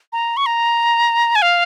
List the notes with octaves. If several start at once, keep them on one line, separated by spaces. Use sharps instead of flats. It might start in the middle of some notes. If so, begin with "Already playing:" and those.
A#5
C#6
A#5
G#5
F5